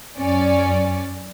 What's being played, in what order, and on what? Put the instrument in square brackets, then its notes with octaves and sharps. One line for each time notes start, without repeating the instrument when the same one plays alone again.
[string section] F#2 C#4 D5